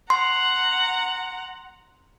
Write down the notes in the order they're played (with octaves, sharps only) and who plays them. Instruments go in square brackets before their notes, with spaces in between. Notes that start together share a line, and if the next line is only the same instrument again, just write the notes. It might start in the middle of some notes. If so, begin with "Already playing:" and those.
[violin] F#5 A#5 [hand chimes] C6